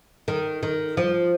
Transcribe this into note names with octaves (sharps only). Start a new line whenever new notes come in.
D#3
D#3
F3